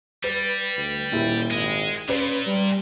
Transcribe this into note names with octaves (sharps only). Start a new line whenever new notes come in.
G3 B4
D2
D#1 A#2 E4 G4
G#1 G#3
A#2 C#4 B4 D5
G3